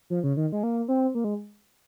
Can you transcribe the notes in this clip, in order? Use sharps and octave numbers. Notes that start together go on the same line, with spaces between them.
F3
C#3
D#3
G#3
A#3
C4
A#3
G#3